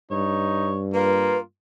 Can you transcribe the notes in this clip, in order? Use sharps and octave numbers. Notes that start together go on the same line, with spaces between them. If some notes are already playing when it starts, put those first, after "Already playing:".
G2 D#4 C#5
A#3 F4 B4